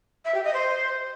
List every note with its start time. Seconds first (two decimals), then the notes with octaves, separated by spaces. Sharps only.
0.25 E5
0.34 G4
0.44 D#5
0.53 C5